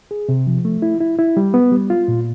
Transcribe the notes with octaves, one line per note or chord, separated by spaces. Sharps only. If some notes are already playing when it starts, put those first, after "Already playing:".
G#4
C3
F3
A3
E4
E4
E4
G3
B3
G3
F4
A#2